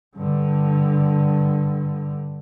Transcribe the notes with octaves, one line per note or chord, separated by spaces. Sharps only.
G2 D3